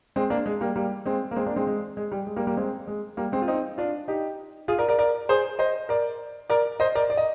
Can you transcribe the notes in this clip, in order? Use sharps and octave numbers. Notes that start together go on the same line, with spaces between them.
G#3 C4
A#3 D4
G#3
G3 A#3
G3 A#3
G#3 C4
A#3
G#3 C4
A#3 D4
G#3 C4
G#3
G#3
G3
G#3
G3 A#3
G3 A#3
G#3 C4
G#3
G3 A#3
G#3 C4
F4
C4 D#4
D4 F4
D#4 G4
F4 G#4
A#4 D5
A#4 D5
A#4 D5
G#4 C5
C5 D#5
A#4 D5
A#4 D5
C5 D#5
A#4 D5
D5
D#5